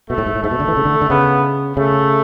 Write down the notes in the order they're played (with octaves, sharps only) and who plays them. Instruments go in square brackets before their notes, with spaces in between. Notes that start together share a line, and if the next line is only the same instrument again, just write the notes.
[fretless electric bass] B2 [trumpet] A3
[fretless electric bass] A2
G#2
A2
[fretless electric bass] G#2 [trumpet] A3
[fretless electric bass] B2
D3
E3
C#3
D3
D3
[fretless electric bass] C#3 [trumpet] B3
[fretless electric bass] C#3 [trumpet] A3